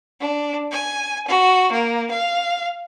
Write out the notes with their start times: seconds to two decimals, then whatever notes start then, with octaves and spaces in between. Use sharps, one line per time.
0.21 D4
0.71 G#5
1.28 F#4
1.72 A#3
2.11 F5